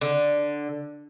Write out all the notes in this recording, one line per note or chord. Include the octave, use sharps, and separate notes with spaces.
D3